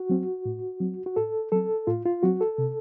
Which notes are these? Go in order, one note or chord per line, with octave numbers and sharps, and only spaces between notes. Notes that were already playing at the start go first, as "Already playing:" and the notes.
Already playing: F#4
F#3 C4
A2
F#3 C4
F#4
A2 A4
F#3 C4 A4
A2 F4
F4
F#3 C4 F#4
A4
C3